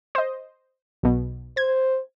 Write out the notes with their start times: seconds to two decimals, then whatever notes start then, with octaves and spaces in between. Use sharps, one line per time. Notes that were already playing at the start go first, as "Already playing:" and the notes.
0.15 C5 D#5
1.03 B1 B2
1.57 C5 G#6